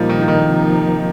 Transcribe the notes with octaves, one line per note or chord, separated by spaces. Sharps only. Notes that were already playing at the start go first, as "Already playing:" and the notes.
Already playing: A#2 F3 G3 A#3 D#4
D#3
F3
D#3
C3 F3 A#3 D#4